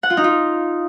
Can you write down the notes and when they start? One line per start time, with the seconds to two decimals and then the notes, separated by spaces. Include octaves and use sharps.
0.03 F#5
0.10 F4
0.17 D#4
0.24 F4